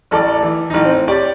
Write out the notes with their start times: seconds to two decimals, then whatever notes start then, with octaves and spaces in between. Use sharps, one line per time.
0.11 A1 A4 D5
0.42 E3
0.70 A1 D#4
0.85 C4
1.08 G4 C#5 D5 D6